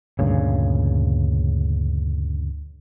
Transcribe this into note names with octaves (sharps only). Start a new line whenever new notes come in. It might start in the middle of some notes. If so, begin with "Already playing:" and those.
D2 G2 A#2 C#3